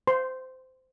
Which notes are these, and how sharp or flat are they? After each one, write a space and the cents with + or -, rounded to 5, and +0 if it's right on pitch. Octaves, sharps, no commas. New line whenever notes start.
C5 -20 C6 +0